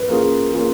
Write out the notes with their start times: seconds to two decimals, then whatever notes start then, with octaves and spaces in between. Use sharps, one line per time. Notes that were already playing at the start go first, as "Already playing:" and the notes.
Already playing: B4
0.08 A#3 C#4 F4 G#4
0.53 A#3 C#4 F4 G#4